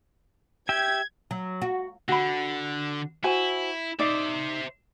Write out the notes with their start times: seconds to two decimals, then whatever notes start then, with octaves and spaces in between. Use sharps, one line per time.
0.69 G4 E5 G5 G#6
1.31 F#3
1.62 F#4
2.09 D3 F#4 B5
3.24 E4 F#4 C5 G#5
3.99 D#4 C5 D5 E5